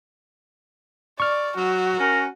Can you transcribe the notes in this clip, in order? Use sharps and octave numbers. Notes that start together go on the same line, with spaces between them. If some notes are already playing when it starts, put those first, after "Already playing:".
D5 C#6 F6
F#3 F#4
C#4 A#4